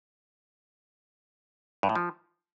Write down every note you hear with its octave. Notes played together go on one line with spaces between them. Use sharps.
G2
A2
F3